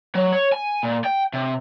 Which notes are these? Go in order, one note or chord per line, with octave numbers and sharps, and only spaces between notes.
F#3
C#5
G#5
A#2
G5
C3